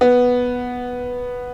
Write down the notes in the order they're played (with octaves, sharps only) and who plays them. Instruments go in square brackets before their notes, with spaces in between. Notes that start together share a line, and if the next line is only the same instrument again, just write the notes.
[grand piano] B3